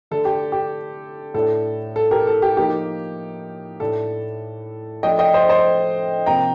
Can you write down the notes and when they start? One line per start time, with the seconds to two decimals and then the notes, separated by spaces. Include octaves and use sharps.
0.11 D3 A3 D4 A4
0.25 G4
0.52 G4
1.34 A2 A3 D4 A4
1.96 A4
2.11 G4 A#4
2.27 A4
2.42 G4
2.57 F3 A#3 D#4 G4
3.80 A2 A3 D4 A4
5.03 F3 A3 D4 D#5 G5
5.19 D#5 G5
5.34 C5 D#5
5.49 C5 D#5
6.26 C3 F3 A#3 G5 A#5